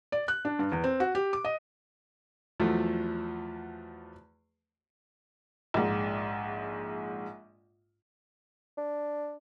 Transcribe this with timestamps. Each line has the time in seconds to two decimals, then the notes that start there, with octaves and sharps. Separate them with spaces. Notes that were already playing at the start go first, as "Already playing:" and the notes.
0.12 D5
0.28 F#6
0.45 D4
0.59 G2
0.72 E2
0.84 C4
1.00 F#4
1.15 G4
1.33 D6
1.45 D#5
2.60 E2 F3 F#3 A3
5.74 A#1 G#2
8.78 D4